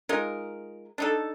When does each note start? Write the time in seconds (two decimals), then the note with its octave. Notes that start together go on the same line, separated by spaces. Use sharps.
0.09 G#3 D#4 F4 A#4
0.98 D4 D#4 A4